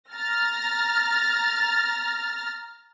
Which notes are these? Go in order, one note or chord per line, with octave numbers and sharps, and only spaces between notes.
A#5 F6 A6 A#6